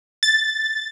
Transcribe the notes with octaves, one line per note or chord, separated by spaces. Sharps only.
A6